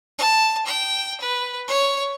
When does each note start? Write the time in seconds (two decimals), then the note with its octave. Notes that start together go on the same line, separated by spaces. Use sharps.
0.18 A5
0.66 G5
1.21 B4
1.68 C#5